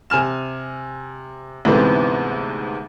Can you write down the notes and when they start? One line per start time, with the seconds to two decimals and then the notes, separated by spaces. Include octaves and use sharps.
0.10 C3 G#5 F6 E7
1.65 D2 G#2 C3 E3 B3 C4